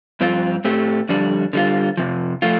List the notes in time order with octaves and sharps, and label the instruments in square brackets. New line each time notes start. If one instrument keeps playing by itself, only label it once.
[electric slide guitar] G2 F3 C4 F4
A2 A3 C4 G4
F2 D3 G3 D4
D3 G3 F4
F2 C3 F3
F3 A3 F4